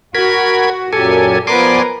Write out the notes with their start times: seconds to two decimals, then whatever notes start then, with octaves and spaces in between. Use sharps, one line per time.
0.15 F#4 A#4 B5 G#6
0.93 F#2 A#2 F#3 G4 A4 G#5
1.47 F3 B3 A#4 B4 D5 G#5 C6 D6